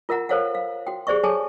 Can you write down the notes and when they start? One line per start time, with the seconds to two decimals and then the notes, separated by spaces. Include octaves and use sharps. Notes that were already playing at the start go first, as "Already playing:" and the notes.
0.09 F4 A#4 E5 F#5 A#5
0.29 A4 A#4 C5 C#5 F5 F#5
0.55 F5
0.87 F#4 G5
1.07 G4 G#4 C5 D5 E5 C#6
1.24 G#4 A4 C#5 G#5 A5